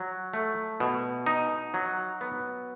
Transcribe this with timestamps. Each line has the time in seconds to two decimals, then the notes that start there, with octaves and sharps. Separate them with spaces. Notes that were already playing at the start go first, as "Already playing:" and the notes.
Already playing: F#3
0.34 A3
0.80 B2
1.26 D#4
1.74 F#3
2.21 B3